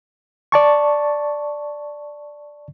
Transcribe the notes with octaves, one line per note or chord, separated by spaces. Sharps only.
D5 A5 C#6